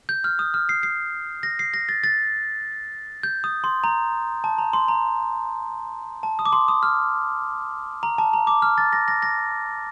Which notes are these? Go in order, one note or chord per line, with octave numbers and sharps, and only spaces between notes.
G6
F6
D#6
F6
C7
C7
A#6
C7
A#6
A6
A6
G6
D#6
C6
A#5
A5
A#5
C6
A#5
A5
D#6
D6
C6
D#6
F6
A#5
A5
A#5
D6
F6
A6
A#6
A#6
A#6